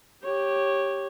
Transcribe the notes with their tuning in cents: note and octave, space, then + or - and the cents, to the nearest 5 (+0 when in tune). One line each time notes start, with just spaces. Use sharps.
G4 +0 C#5 -10